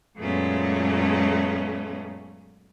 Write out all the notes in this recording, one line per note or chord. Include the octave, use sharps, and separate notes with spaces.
F#2 A#2 G#3 A3 B3 C#4